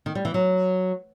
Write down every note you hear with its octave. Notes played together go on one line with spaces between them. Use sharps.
D#3
G3
E3
F#3